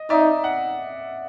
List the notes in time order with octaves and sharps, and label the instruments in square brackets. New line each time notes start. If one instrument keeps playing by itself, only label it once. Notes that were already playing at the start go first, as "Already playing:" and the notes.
Already playing: [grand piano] D#5
[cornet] D#4 [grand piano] D5 E5
[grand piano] F#5